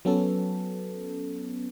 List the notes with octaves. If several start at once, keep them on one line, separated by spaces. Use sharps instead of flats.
F#3 B3 C#4 A4